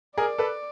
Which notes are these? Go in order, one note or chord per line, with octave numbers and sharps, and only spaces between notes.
G#4 A#4 D5
A4 B4